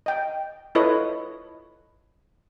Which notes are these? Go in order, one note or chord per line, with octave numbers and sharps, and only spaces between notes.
D#5 G5
E4 F4 A4 B4 C#5 D#5